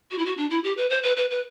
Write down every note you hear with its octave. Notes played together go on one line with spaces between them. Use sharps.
F#4
E4
F#4
D4
E4
G4
B4
C5
B4
B4
B4